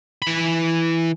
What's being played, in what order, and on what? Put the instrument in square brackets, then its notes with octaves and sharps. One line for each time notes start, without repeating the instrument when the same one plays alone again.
[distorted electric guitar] E3 B5